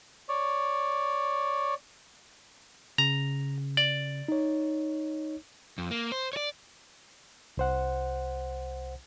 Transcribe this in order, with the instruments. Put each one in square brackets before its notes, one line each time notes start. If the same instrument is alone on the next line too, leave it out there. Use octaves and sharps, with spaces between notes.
[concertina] C#5 D5
[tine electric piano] C#3 [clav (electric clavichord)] A#5
[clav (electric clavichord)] D5
[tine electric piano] D#4 C#5
[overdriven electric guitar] F2
A#3
C5
C#5 D5
[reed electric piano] C2 C5 F#5